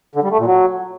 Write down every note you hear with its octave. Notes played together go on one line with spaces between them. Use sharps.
D3
G3
A3
A#2
F#3